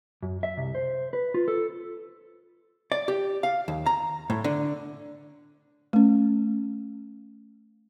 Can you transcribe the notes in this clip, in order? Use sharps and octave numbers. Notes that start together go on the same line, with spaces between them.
F#2
E5
C2
C5
B4
F4
A4
D5
G4
F5
D#2
A#5
A2
D3
A3 C#4